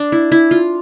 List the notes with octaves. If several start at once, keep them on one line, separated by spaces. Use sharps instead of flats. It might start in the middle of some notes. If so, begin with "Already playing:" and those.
Already playing: D4
E4
E4
F4